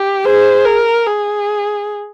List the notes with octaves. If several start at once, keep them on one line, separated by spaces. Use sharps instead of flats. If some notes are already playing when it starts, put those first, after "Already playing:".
Already playing: G4
G#4 C5
A#4
G#4